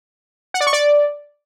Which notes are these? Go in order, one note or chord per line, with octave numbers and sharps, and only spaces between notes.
F#5
D5
C#6
D5